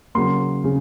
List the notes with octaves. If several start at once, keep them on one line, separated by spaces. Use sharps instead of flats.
C#3 F#3 A#3 C6
C#3